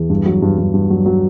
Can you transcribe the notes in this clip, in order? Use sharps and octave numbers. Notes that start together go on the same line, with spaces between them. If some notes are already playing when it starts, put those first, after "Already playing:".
Already playing: E2
G2
F#3
G2
G2
G2
F#3
F#3